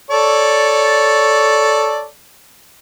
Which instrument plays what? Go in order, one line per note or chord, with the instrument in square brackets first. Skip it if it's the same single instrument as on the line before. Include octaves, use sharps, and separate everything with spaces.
[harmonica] A4 C#5 D5